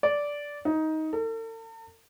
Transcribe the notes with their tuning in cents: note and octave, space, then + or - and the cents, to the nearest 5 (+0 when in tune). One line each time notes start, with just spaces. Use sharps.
D5 -10
D#4 +15
A4 +45